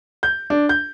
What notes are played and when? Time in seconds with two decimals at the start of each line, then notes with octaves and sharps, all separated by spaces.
0.23 G6
0.50 D4
0.69 G6